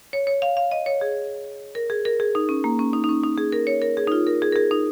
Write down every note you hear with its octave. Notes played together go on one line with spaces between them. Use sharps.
C#5
C#5
F5
F5
D#5
C#5
G#4
A#4
G#4
A#4
G#4
D#4
C#4
A#3
C#4
D#4
D#4
C#4
D#4
G#4
A#4
C#5
A#4
G#4
D#4
F4
A#4
G#4
A#4
G#4
D#4